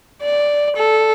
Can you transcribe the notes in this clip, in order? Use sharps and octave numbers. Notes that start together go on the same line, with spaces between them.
D5
A4